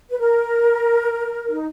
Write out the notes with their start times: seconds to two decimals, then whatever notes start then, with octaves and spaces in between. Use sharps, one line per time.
0.10 B4
0.19 A#4
1.49 D#4